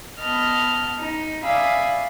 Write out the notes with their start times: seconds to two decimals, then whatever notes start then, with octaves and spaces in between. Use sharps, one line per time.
0.20 B3 B4 D#5 A5 F6
0.98 D#4
1.43 D5 E5 F5 G#5 B5 D#6